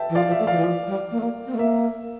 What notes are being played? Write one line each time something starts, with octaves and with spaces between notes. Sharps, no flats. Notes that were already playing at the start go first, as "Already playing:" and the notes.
Already playing: E5 G5 A5
E3
F3 D5 F5
F3
E5
A3
F3 D5 F5
E3
F3
G3
A#3
A3
A#3
C4
A3
A#3 E5